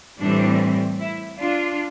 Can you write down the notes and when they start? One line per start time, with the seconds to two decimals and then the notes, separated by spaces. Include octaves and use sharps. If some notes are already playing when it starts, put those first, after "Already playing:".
0.19 A2 E3 G3 C4 D4
0.99 E4
1.39 D4 F4